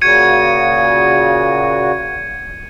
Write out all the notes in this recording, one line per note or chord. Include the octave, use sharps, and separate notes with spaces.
A#2 C#3 F#4 G#6 C#7 D#7